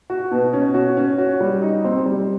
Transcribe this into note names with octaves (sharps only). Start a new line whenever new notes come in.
F#4
B2
C#4
F#4
C#4
F#4
G3
D#4
C4
G3